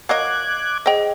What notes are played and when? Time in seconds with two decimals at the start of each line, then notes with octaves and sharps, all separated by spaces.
0.09 F#3 A#4 D#5 F5 D6 F#6 G#6
0.86 G#4 C5 D#5 G5